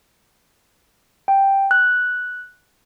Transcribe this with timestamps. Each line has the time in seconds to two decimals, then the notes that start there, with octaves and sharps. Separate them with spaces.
1.28 G5
1.71 F#6